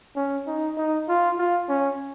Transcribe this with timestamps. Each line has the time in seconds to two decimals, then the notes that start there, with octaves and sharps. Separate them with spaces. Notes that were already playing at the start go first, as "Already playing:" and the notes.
0.16 C#4
0.47 D#4
0.77 D#4
1.08 F4
1.38 F4
1.69 C#4